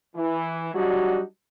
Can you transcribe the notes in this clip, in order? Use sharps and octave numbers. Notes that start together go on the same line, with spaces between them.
E3
F#3 G3 D4 D#4 F#4